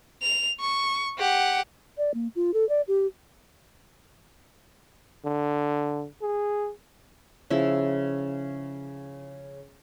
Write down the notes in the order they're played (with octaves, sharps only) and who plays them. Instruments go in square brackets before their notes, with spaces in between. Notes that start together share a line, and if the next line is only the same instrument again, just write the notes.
[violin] F7
C#6
G4 F#5
[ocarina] D5
A#3
F4
A4
D5
G4
[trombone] D3
G#4
[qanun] C#3 F3 E4